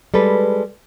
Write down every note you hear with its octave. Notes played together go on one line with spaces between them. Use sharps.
G3 G#3 A4 B4